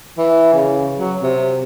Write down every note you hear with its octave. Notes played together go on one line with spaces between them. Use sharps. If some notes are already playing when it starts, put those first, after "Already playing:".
E3
C#3
F#3
C3